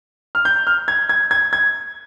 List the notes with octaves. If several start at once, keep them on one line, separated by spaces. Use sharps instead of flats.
F6
G6
F6
G#6
G#6
G#6
G#6